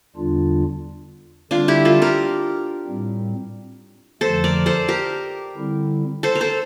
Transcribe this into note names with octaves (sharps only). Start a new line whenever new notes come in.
E2 D3 G3 D4 F4
D3 G3 C4 D4 F4
E4 G4
F4 A4
G4 A#4
A2 G3 C4
F2 D3 F3 A3 A4 C5
A#4 D5
A4 C5
G4 A#4
D3 G3 C4 E4
A4 C5
A#4
A4 C5